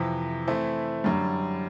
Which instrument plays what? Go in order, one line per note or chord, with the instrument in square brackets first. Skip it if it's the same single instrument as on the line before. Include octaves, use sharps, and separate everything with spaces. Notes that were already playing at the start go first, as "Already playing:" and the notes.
Already playing: [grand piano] F2 C3 E3
E3 A3 C4 E4
F#2 D3 G3